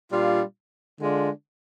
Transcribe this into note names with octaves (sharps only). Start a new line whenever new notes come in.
A#2 G3 D4 F4
D3 G#3 D4 F4